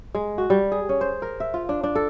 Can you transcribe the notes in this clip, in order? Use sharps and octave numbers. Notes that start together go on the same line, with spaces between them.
G#3
F#4
G3
G#4
C#4
C5
A#4
E5
F4
D4
D4
A4